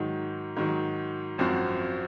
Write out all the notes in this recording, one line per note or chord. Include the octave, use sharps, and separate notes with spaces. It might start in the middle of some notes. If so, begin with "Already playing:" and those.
Already playing: G#2 D#3 F#3
G#2 D#3 F#3
G#1 F#2 F3 C4 F#4